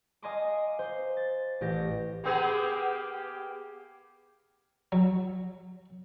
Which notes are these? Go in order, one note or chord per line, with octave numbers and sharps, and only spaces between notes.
D#5 F5 G#5 A#5 C6 D6
C5
A6
A1 G4 A#6
A#3 B3 G4 G#4
F#3